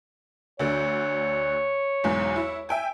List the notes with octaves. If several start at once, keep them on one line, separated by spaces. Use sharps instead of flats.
D2 D3 C#5
B1 E2 G#2
E4
E5 G5 G#5